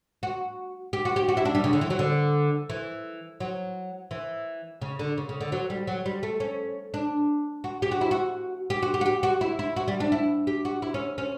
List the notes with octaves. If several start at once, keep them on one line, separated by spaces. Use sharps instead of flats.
F#4
G4
F#4
G4
F#4
E4
D4
G3
C#3
D3
E3
F#3
D3
E3
F#3
E3
C#3
D3
C#3
C#3
D3
F#3
G3
F#3
G3
A3
C#4
D4
F#4
G4
F#4
E4
F#4
G4
F#4
G4
F#4
G4
F#4
E4
E4
F#4
G3
D4
E4
G4
F#4
E4
C#4
C#4